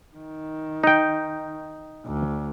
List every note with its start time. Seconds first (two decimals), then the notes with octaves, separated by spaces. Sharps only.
0.17 D#3
0.84 D#4 G5
2.06 D2